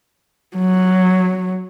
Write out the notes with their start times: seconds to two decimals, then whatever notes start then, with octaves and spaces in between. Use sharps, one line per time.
0.57 F#3